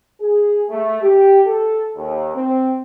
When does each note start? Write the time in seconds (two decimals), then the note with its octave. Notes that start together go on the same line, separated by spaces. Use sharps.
0.21 G#4
0.69 A3
1.02 G4
1.47 A4
1.96 D#2
2.35 C4